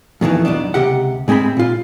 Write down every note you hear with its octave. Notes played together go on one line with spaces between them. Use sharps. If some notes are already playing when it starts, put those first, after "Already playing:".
F2 B2 D#3 E3
B1 E2 B2 D4
C#2 C3 G4 F#5
G#2 G#3 C4 G#4 B5
A#2 F4